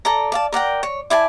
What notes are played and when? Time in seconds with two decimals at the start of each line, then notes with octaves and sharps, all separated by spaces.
0.05 A4 D5 A#5
0.32 D5 F5 A5
0.52 A#4 D5 F#5 G5
0.83 C#5
1.10 E4 D5 G#5 A5